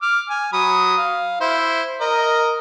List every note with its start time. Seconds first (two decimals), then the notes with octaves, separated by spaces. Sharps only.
0.02 D6 F6
0.30 G#5
0.53 F#3 B5 D#6
0.97 F5
1.41 E4 C5
2.01 A#4 D#5